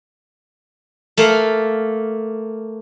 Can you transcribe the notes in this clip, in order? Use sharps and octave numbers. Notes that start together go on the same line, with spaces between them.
A3 A#3 A4 F5